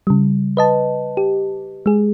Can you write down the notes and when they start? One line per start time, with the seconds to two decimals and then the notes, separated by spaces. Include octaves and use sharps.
0.07 C#3 G3
0.57 B4 D#5 A5
1.17 G4
1.86 G#3 G#4